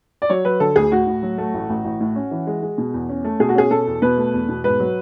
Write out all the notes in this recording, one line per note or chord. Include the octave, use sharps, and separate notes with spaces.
D5
F#3 C#5
F#3 B4
D3 A4
D2 G#4
A2 F#4
A2
F#3
A3
A1
A1
A1
A2
C#4
E3
G#3
G#3
B2
E2
C#4
A3
B2 G#4
F#4
C#4 G#4
B2 A4
E2
B2 B4
A3
E2
B2
G#2 B4
F#3